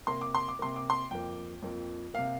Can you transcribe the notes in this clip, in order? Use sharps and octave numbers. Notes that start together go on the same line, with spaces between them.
C3 A#3 C6
D6
C6
D6
C3 A#3 C6
D6
C6
F2 F3 A#3 G5
F2 F3 A#3
C3 A#3 F5